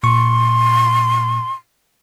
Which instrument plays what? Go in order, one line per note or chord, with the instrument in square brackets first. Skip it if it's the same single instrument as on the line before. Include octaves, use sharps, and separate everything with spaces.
[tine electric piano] A#2 C#6 [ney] C6